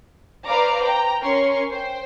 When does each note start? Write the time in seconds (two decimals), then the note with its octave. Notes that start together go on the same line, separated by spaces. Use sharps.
0.46 B4 C5 D5 F5 A#5 D6
0.83 G5 A#5
1.22 C#4 A#4 C6 C#6
1.71 C5 G5